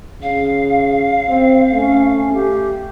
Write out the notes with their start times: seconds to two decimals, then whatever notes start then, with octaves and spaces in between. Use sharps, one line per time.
0.22 C#3 F5
1.29 C4
1.72 A3 C#4
2.33 G4